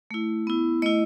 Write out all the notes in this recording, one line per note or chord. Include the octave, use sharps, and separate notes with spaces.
A3 E4
B3 E4
A3 E4 D#5